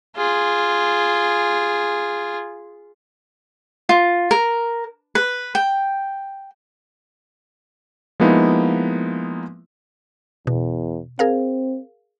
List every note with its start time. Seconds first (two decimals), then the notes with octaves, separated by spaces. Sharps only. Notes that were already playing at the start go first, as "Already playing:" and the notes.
0.16 F4 G#4
3.89 F4
4.31 A#4
5.15 B4
5.55 G5
8.20 F3 G#3 A#3 B3 D#4 E4
10.47 E2 B2
11.19 C4 G#4 A#4 F5